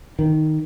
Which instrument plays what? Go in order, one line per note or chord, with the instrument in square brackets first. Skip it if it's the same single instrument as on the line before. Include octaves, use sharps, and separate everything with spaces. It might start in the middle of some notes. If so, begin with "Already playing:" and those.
[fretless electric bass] D#3